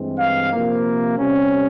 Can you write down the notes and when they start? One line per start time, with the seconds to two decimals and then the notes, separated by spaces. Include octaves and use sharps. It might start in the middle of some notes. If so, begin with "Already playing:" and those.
Already playing: G2 E3 G#3 C4
0.19 F5
0.52 C3 F3 A#3
1.18 C3 G3 C#4